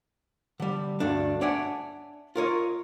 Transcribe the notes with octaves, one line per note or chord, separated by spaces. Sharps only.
D3 G3
D2 G2 A3 D4
D4 C#5 D5 E5 F#5 G#5
F4 A#4 C#5 D#5